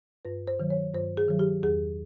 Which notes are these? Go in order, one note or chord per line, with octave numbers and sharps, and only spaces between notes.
G2 B4
C5
D#3 F#3
C#5
G2 C5
G#4
D#3 F#3
G4
E2 G#4